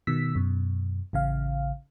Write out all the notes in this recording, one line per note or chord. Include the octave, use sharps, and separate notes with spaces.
B2 D#3 E6 B6
F#2 B2
A1 C#3 F5